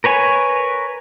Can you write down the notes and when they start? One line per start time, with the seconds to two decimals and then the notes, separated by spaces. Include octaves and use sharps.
0.04 A#4 B4 C#5 G#5